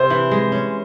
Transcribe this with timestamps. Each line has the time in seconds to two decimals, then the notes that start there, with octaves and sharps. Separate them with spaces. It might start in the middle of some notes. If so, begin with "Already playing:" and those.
Already playing: C3 C5
0.10 E3
0.31 G#3
0.52 C#4